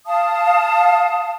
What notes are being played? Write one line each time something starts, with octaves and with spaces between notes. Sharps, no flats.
F5 A5 D#6